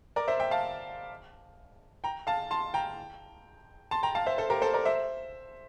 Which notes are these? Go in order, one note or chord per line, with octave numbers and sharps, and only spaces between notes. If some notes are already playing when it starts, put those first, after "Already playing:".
A#4 D5
C5 E5
E5 G5
F5 A5
G5 A#5
F5 A5
A5 C6
G5 A#5
A5 C6
G5 A#5
F5 A5
C5 E5
A4 C5
G4 A#4
A4 C5
A#4 D5
C5 E5